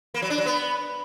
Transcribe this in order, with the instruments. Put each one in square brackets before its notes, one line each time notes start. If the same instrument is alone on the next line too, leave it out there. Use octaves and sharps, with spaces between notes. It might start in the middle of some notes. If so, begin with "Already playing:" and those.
[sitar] A#3
F#3
D4
F#3
B3